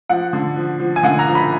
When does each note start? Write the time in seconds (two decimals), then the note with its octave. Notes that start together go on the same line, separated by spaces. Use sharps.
0.09 F3 F#5
0.33 D3
0.56 F3
0.80 F3
0.96 G#5
1.03 D3 F#5
1.19 A#5
1.27 F3
1.35 B5